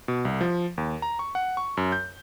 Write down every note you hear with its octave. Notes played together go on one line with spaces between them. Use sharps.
B2
C2
F3
D#2
A#5
C#6
F#5
C#6
F#2
G6